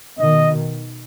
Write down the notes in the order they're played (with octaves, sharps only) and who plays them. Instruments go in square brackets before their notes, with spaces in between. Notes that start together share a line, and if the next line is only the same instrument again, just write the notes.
[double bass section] B2 D#3 [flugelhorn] D#5